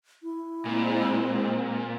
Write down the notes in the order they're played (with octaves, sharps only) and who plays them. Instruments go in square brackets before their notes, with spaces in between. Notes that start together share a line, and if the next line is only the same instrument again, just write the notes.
[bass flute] E4
[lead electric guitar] A#2 [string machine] G#3 C4